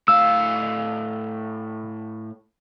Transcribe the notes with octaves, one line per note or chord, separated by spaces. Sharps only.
A2 F5 E6